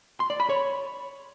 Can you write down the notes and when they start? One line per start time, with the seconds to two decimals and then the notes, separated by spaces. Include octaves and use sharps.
0.20 C6
0.30 D5
0.40 B5
0.49 C#5